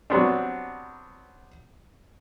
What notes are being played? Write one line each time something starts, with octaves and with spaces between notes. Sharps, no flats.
F#3 G3 B3 C4 D4